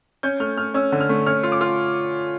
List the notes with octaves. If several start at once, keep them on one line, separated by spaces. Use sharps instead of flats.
C#4 G6
A3 F6
A3 F6
C#4 E6
D3
F6
A3
C#4 F6
F4
D6
F4